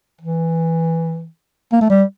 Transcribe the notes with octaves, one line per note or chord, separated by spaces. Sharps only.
E3
A#3
A3
G3